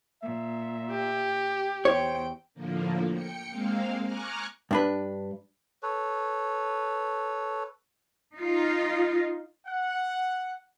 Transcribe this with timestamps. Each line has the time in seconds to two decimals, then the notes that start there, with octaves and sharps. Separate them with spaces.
0.23 A#2 E5
0.90 G4
1.85 E2 C5 C#5 G5
2.54 A2 D3 F3 A#3
3.12 G5 C#7
3.50 G#3 A#3 C4 F5
4.05 G#5 A#5 C#6 D6 F6 F#6
4.71 G2 D4 B4
5.83 A4 B4 C#5
8.35 D#4 F4
9.67 F#5